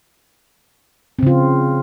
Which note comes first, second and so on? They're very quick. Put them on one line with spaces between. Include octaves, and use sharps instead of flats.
C4 C#3 F4